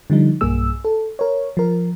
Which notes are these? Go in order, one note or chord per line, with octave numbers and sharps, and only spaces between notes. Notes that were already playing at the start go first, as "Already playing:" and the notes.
D3 F3 G3 D#4
B1 G2 A#3 G#4 E6
A4
A#4 C#5
F3 A#4